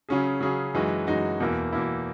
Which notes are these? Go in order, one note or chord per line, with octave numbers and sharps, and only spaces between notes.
C#3 F#3 C#4 G#4
C#3 F#3 C#4 G#4
F#2 E3 G#3 D#4 F#4
F#2 E3 G#3 D#4 F#4
E2 B2 A#3 E4
E2 B2 A#3 E4